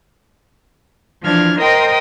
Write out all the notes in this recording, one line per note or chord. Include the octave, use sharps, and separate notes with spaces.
E3 F3 D4 F6 G#6
A#4 C5 D#5 G5 C6 D#6